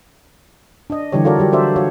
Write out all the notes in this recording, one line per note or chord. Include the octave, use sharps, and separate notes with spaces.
D4 D#5
D3 E3 G3 G4 C#5
F4 F#4 A4 A#4 C#5 D5
F#3 G3 G4
D4 F#4 A4 C5 D5 E5
F4 F#4 C#5